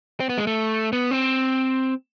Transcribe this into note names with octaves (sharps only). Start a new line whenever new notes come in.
C4
B3
G#3
A3
B3
C4